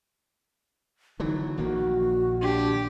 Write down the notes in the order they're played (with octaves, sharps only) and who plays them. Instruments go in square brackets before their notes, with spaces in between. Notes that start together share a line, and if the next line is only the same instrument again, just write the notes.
[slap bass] D3 E3 F#3 [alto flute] D#4
[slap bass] A#1 D#3 A#3 [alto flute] F#4
[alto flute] D4 [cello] G4